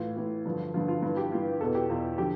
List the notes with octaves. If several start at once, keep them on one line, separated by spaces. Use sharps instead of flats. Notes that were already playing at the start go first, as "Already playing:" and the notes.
Already playing: A2 E3 F4
A2 E3
G2 D3 F3
G2 D3 F3 F4
F4
G2 E3 F4
G4
G2 E3 F4
E2 B2 A4
G4
E2 B2 F4
D3 F3 G4